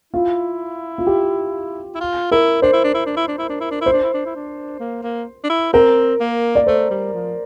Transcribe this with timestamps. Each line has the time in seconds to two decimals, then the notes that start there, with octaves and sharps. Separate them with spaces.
0.13 E4 F4
0.98 F4
1.07 G4
1.95 E4
2.01 F4
2.31 E4 A#4
2.62 D4 C5
2.73 E4
2.84 D4
2.94 E4
3.06 D4
3.16 E4
3.28 D4
3.38 E4
3.49 D4
3.60 E4
3.71 D4
3.81 E4 C5
3.93 D4
4.03 E4
4.14 D4
4.25 E4
4.35 D4
4.79 A#3
5.03 A#3
5.44 D4
5.50 E4
5.73 C4 A#4
6.20 A#3
6.55 D5
6.66 A3 C5
6.90 G3
7.13 F3